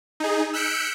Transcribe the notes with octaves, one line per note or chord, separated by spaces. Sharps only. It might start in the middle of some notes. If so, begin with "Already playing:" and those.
D#4 G#4
E6 F#6 G6 B6 C#7 D7